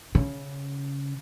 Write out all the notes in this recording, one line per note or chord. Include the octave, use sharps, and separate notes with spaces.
C#3